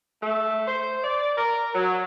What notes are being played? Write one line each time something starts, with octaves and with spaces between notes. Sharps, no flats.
A3
C5
D5
A#4
F#3